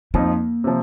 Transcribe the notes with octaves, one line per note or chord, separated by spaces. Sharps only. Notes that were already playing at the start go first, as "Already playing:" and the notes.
F2 F3 A#3 D#4
C3 F3